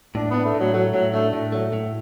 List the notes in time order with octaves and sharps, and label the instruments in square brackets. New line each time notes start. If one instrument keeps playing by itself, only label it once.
[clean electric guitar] A2 [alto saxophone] D4
[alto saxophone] B3 [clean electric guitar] D4
[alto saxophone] A3
[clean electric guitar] A2
[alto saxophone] F#3
[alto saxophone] F#3 [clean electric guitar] A3
[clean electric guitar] A2 [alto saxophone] F#3
[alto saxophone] A3 [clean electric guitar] D4
[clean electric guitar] A2 [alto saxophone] A3
[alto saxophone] F#3 [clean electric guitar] A3
[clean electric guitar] A2